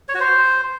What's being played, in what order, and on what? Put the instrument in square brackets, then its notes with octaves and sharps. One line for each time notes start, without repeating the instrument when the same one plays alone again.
[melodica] C#5
F#4
C5